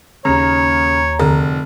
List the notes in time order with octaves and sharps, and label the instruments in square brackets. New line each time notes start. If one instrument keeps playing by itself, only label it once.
[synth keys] D#2 A#5 [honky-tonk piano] C#3 [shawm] C#5
[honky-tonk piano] F1 [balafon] D3 G#4